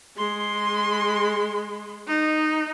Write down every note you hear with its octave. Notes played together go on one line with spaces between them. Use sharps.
G#3 C6
D#4